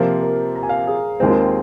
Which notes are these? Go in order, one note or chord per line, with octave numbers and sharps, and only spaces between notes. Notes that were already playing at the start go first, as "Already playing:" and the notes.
Already playing: C3 F3 A#3 F4 C5
A#4
A#5
G#5
F5
G#5
G#4
D#2 D#3 G#3 C4 G#4
F4